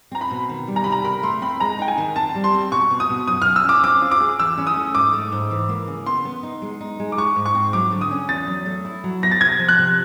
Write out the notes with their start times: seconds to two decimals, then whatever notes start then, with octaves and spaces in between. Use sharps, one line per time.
0.11 C4 A#5
0.21 B5
0.31 B2
0.49 D#3
0.68 G3
0.76 A#5
0.84 C3 B5
0.92 A#5
1.05 A#4 B5
1.23 A3 C6
1.42 C4 B5
1.60 G#3 A#5
1.79 D#4 G5
1.88 G#5
1.98 D#3
2.16 C4 A5
2.35 G3
2.44 C6
2.54 C4
2.71 B2 C#6
2.90 B2
3.00 D#6
3.09 B2
3.27 F#2 D#6
3.42 C#4 F6
3.56 E6
3.64 C#4 D6
3.83 C4 D6
4.02 F4
4.12 D6
4.20 G#4
4.39 E3 E6
4.57 C#4
4.67 D#6
4.76 A3
4.95 G#2 D6
5.13 A3
5.32 G#2
5.51 E3
5.69 A#3
5.87 C#3
6.06 B3 C6
6.25 B3
6.43 D#4
6.62 G#3
6.81 D#4
7.00 G#3
7.12 D6
7.18 G#3 C#6
7.36 G#2
7.46 C#6
7.55 C4
7.73 F#3 D6
7.92 D3
8.01 D#6
8.11 C#4
8.29 E2 A6
8.48 F#3
8.66 A3
8.85 E4
9.04 F#3
9.22 B3 A#6
9.32 A6
9.41 C3 G#6
9.59 F3
9.69 F#6
9.78 C3